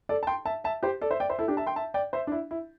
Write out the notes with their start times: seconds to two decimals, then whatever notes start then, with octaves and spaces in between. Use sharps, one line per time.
0.09 A4 D5
0.23 A5
0.27 G5 C6
0.45 E5 A5
0.64 E5 A5
0.83 G4 C5
1.01 A4 D5
1.11 C5 E5
1.20 D5 G5
1.29 C5 E5
1.39 E4 A4
1.48 D4 G4
1.57 E5 A5
1.66 G5 C6
1.76 E5 A5
1.94 D5 G5
2.13 C5 E5
2.27 D4
2.32 E4
2.51 E4